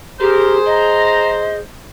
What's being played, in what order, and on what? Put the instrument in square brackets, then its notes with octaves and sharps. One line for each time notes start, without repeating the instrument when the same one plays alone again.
[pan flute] G4 [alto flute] G#4 [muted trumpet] A#4 [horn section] C5
[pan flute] D#5 [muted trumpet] A#5